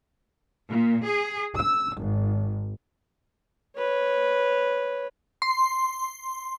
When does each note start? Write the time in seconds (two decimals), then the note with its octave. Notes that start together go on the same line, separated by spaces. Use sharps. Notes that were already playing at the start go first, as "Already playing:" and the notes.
0.67 A#2
1.05 G#4
1.57 E6
1.97 G#1
3.76 B4 C#5
5.42 C6